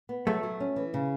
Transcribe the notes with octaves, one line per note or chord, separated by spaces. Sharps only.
B3
F#3 A3
F#3
C#4
E3
C#3